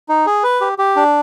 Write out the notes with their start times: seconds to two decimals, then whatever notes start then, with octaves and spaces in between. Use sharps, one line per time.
0.09 D#4
0.26 G#4
0.43 B4
0.61 G4
0.78 G4
0.96 D4